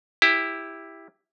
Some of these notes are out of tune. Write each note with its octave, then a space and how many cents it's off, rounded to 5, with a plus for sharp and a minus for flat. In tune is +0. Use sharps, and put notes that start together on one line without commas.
E4 +0 G4 +15